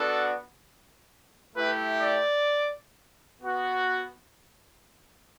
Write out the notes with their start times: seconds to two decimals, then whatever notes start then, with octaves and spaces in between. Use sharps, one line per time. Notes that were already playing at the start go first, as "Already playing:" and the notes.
Already playing: B3 D4 F#4 A4
1.55 A3 E4 G4 B4
2.02 D5
3.42 B3 F#4